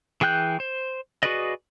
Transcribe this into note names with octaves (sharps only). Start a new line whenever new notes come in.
E3 G#4 G5 F#6 G6
C5
F#4 G#4 B4 D5 D#5